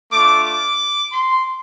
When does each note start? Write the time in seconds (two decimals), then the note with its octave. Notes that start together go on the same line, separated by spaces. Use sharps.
0.11 A3 D4 F4 D6
0.45 D6
1.12 C6